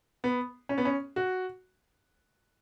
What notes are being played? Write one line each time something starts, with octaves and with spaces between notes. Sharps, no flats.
B3
C#4
B3
C#4
F#4